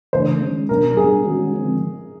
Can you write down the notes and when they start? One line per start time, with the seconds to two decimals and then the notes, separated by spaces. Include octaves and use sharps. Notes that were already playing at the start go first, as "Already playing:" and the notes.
0.13 C#3 E3 A3 D4 C5
0.42 D#3 G#3 C#4
0.69 B2 F#3 B3 D4 A#4
0.97 G3 B3 D4 G#4
1.25 D#3 G#3 C#4 F#4
1.53 D3 F3 G#3 C4